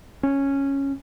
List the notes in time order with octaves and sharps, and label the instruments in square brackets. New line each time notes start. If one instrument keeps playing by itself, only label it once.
[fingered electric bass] C#4